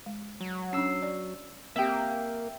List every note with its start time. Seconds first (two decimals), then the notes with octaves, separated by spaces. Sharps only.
0.06 G#3
0.41 F#3
0.73 C#4 D4 E6 C7
1.02 D5
1.76 A#3 C4 G4 E5 G5